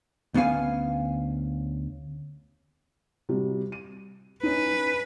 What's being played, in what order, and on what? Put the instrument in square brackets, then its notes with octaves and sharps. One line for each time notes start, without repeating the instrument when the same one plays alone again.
[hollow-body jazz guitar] D2 B3 C#4 F5 G#5
[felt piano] C3 G3 F#4
D#7
[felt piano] C#4 D#4 [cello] B4